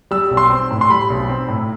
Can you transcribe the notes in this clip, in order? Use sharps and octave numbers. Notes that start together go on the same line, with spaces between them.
G3 E6
B1
C6
C4
A2
C6
G3 B5
B1
C4
A2